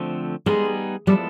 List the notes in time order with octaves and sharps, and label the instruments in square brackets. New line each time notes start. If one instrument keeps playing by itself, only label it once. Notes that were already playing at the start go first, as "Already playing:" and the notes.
Already playing: [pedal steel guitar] D3 F3 A3 C4
[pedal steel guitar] G3 B3 D#4 G#4 [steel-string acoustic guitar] G#3
[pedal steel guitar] F3 G#3 B3 E4 A4 [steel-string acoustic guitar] G3